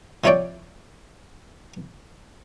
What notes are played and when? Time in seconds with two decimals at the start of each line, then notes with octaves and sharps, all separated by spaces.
0.24 C3 F3 E4 C#5 D5 G5